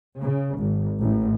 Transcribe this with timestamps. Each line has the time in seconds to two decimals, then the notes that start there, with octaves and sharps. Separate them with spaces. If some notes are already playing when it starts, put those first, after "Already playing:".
0.19 C#3
0.56 G#1
1.01 A1